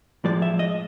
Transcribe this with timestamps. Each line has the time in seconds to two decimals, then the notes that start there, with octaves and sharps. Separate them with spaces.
0.24 A2 F3 G#3 D5
0.42 E5
0.59 D#5